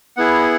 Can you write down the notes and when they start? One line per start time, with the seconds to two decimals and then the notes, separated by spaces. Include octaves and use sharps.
0.17 B3 E4 G#4 F#5